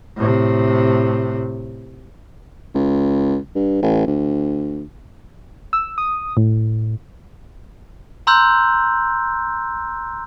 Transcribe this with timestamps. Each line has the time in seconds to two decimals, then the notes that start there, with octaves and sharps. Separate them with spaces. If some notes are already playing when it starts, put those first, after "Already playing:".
0.17 A2 C3
2.75 C#2
3.55 G2
3.82 A1
4.07 D2
5.73 E6
5.98 D#6
6.37 A2
8.27 A#5 C6 E6 F#6 G6